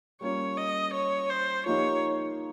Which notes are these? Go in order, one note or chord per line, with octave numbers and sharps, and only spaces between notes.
G3 A#3 C#4 F4 C#5
D#5
C#5
C5
F3 A#3 D#4 G4 C#5